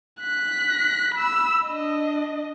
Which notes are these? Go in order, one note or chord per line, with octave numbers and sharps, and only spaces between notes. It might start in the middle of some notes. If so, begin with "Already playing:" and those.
F#6 B6
B5 E6
D4 D#5